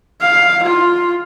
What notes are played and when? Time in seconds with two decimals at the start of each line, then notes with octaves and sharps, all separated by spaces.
0.21 F5
0.63 F4